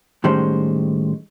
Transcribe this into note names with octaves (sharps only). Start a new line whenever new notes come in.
A2 D#3 G3 G#3 C#4 C5